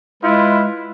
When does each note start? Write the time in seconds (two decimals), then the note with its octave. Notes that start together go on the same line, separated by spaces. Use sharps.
0.23 G#3 E4 F4 B4